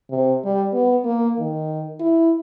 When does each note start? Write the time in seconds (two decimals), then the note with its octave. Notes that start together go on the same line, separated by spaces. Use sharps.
0.10 C3
0.44 G3
0.74 B3
1.05 A#3
1.39 D#3
2.00 E4